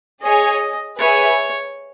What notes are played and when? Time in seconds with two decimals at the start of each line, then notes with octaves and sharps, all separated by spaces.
0.22 G#4 C#5 D#5 G#5
0.98 G#4 B4 C#5 E5 G#5